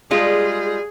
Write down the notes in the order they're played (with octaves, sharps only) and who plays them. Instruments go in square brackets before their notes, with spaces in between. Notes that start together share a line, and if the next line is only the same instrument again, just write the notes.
[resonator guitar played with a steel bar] G3 G#3 F4 [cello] G#4